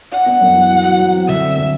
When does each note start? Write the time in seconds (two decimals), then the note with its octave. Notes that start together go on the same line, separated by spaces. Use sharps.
0.12 D4 F#5
0.26 B3
0.41 F#2
0.55 E3
0.70 F#3
0.85 F#4
0.99 F#3
1.13 C4
1.28 D3 E5
1.43 C4
1.57 D3